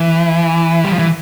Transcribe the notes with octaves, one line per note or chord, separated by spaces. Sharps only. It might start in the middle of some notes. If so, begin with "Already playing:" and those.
Already playing: E3
G3
F3
E3